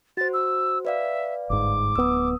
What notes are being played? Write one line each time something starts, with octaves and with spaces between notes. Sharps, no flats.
F#4 C5 A6
E6
B4 D5 E5 F5
G1 G#2 D6
D1 B3 D#6 E6